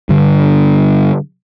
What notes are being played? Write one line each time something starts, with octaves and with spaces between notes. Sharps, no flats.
G2 D3